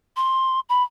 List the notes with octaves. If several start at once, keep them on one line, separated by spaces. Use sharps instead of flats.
C6
B5